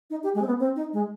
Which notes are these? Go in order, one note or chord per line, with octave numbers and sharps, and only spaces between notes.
D#4
G4
G#3
C4
B3
C4
D#4
G#3